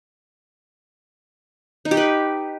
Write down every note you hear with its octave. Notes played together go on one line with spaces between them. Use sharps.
D#4
G4
B4